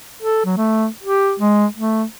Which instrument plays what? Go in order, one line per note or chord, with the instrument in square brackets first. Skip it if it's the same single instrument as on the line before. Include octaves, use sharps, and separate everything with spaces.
[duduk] A4
F#3
A3
G4
G#3
A3